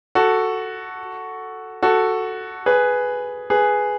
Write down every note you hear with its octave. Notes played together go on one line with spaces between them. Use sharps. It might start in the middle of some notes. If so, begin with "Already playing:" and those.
F#4 A4
F#4 A4
G#4 B4
G#4 B4